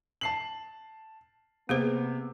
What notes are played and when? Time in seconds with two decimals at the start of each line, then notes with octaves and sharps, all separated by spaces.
0.21 A5 C7 F#7
1.69 C3 A#3 B3 G#4 C5